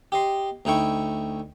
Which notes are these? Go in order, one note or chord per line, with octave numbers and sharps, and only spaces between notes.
G4 D#5 C6
D2 D#4 E4 G5 C#6